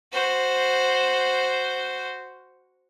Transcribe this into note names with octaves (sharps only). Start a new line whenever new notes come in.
F#4 C5